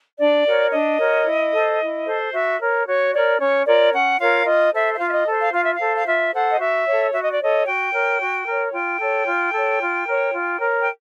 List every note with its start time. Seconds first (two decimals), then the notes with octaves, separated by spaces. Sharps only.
0.19 D4 D5
0.45 F#4 A#4 C#5
0.72 D4 D#5
0.99 F#4 A#4 C#5
1.26 E4
1.53 A4 C5
1.79 E4
2.06 A4 C5
2.32 F#4 E5
2.59 A#4 C#5
2.86 F#4 C#5
3.12 A#4 C#5 D5
3.39 C#4 C#5
3.66 F4 A#4 C#5 D5
3.92 C#4 F#5
4.19 F4 A#4 C#5 F5
4.46 F4 D#5
4.73 A4 C5 E5
4.93 E5
4.99 F4 F5
5.08 E5
5.12 D#5
5.26 A4 C5
5.39 F5
5.52 F4 F5
5.63 E5
5.74 F5
5.79 A4 C5
5.95 F5
6.06 F4 E5
6.33 A4 C5 F#5
6.50 D#5
6.59 F#4 E5
6.85 A4 C#5
7.13 F#4 E5
7.23 D#5
7.33 D5
7.39 A4 C#5 D#5
7.66 F#4 G5
7.93 A#4 C#5
8.20 F#4
8.46 A#4 C#5
8.73 F4 G5
8.99 A4 C#5
9.26 F4
9.53 A4 C#5
9.80 F4
10.07 A#4 C#5
10.33 F4
10.59 A#4 C#5
10.80 G5